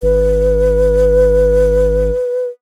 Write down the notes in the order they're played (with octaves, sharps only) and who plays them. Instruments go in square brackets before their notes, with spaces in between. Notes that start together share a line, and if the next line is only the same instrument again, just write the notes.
[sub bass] G#1 [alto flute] B4